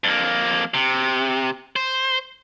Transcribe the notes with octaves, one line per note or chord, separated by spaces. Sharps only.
F2 A#3
C3
C5